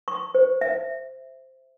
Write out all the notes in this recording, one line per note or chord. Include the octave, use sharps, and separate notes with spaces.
C#6
C5
E5